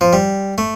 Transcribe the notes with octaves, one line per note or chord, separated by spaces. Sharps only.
F3
G3
A3